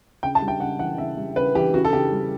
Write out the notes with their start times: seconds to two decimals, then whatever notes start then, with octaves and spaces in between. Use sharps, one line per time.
0.23 C#3 G5
0.35 A5
0.42 G3
0.48 G5
0.60 C#3 F#5
0.79 E3 F#5
0.98 C#3 E5
1.17 G3
1.36 C#3 B4
1.55 E3 G4
1.74 C#3 F#4
1.85 A4
1.93 C#3 G4
2.12 G3